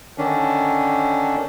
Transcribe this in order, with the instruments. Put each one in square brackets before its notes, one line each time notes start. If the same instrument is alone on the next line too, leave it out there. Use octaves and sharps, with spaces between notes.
[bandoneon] D3 D#3 C#4 D4